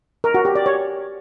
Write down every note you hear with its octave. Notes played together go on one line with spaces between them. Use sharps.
A#4
F#4
G4
D5
C#5